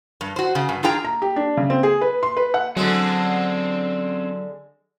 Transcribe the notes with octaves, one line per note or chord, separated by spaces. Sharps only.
G2
F#4 C5
C#3
G2
D4 F4 G#4 G5 A#5
A#5
G4
D4
C#3
C4
G#4
B4
C6
B4
F#5
D3 F#3 G#3 C4 C#4